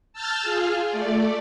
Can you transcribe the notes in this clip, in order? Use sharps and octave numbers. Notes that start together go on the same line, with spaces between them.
A5 E6 F6 G6 A6
F4 G#4
A3 D5